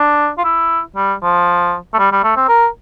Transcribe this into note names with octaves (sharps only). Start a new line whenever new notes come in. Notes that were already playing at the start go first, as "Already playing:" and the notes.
Already playing: D4
F4
E4
G3
F3
A3
G3
G3
A3
C4
A#4